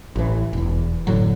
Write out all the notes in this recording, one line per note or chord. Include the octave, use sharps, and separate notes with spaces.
A1 E3
E1 E2
F#1 A2 D3 F#3